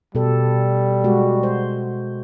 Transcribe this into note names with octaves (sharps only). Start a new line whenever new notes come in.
B2 G3 A4
G#3 F#4
C5